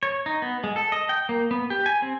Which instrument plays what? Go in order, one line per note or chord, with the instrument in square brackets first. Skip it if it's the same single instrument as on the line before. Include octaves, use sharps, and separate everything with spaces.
[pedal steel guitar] C#5
D#4
B3
G#3
A4
D#5
G5
A#3
B3
G4
G#5
C4